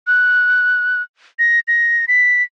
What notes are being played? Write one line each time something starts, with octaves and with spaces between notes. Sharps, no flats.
F#6
A#6
A#6
B6